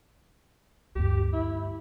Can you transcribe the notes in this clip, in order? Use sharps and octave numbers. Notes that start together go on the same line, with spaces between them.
D2 G2 G4
E4